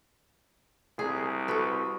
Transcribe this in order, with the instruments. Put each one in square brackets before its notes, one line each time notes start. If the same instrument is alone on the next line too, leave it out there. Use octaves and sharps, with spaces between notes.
[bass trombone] C2 [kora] G#4
[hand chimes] F#4 C#6 D#6 [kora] A4 B4